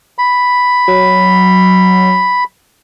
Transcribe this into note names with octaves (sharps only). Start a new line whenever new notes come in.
B5
F#3